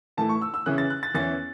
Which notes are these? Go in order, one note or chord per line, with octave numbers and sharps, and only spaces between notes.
A2 E3 A3 E4 A5
C#6
E6
E6
C#3 E3 C#4 E4 F#6
A6
F#6
A6
E2 E3 C#4 E4 A6